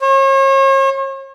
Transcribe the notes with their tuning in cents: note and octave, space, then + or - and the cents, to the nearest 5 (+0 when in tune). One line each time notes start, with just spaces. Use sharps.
C#5 -40